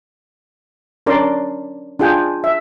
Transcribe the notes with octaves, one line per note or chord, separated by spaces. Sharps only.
C#4 D4 A#4 D5 C6
D4 F4 G#4 G5 G#5
E5